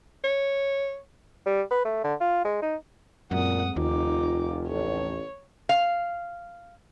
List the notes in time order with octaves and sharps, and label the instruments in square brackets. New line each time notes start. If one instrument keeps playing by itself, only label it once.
[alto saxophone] C#5
[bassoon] G3
B4
A3
D3
F4
G#3
D#4
[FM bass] F#2 [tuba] A#2 [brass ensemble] G#3 A3 C4 [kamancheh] F#5 D#6
[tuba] F1 [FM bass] D#2 [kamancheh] D#4 D6 [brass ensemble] F4
[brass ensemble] A1 [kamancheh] C#5
[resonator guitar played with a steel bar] F5